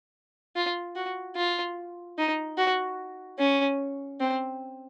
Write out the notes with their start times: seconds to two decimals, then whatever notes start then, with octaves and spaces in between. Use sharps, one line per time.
0.56 F4
0.96 F#4
1.36 F4
2.18 D#4
2.57 F#4
3.39 C#4
4.20 C4